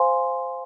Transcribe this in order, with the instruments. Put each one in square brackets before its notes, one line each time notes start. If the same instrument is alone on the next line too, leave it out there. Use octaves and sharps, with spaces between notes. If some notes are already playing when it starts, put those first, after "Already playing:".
Already playing: [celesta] C5 F5 G#5 C6